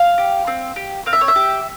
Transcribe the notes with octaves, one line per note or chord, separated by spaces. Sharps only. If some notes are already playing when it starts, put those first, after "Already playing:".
Already playing: F5
G4
C4
G4
C4 F5
E5
C#5
E5
G4